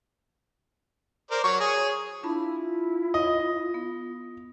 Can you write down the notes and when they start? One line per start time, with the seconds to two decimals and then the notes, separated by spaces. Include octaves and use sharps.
1.31 A#4 C5 D5
1.44 F#3 C#5 C#6
1.60 G#4 C#5
2.23 D4 E4 F4 A5 B5
3.14 D#5
3.74 B3